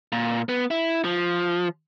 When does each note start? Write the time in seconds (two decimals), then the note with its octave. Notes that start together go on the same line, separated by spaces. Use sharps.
0.12 A#2
0.49 B3
0.71 E4
1.05 F3